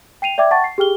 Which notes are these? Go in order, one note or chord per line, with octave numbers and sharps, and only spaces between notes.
G5 C7 D#7 F7
D5 E5 G5 D6 G#6
F#5 G5 A5 C#6 A6
C7
G4 G#4 G5 F6 G7